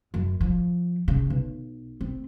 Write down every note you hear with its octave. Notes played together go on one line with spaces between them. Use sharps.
F#2
F3
C#3
B1
C4